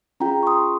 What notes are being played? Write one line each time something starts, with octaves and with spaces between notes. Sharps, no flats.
C#4 F4 G#4 G5 A#5
C#6
C6 D#6